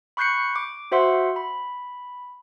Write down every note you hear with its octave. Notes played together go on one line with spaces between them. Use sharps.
B5 C#6 F#6 G6 C7 C#7
D6
F#4 C5 E5 F#5 C6
B5